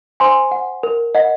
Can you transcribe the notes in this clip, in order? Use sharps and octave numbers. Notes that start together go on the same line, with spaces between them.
C5 G#5 C6
F#5
A#4
D#5 F#5